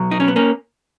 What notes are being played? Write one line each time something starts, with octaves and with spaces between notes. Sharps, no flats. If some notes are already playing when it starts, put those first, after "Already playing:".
Already playing: B2 F#3
D#4
C#4
B3
A#3 C#4